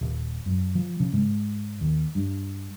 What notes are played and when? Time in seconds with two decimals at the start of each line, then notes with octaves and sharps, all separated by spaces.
0.01 D#1
0.46 F#2
0.75 F3
1.00 C#3
1.13 G#2
1.81 D#2
2.15 G2